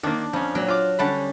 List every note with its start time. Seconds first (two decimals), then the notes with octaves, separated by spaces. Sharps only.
0.03 D#3 A#3 D4
0.33 F2 F3 C#4
0.55 A#2 F#3
0.68 F4 D6
0.99 D3 G3 C#4 F#5 A5 B5